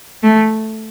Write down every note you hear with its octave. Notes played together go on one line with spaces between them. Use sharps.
A3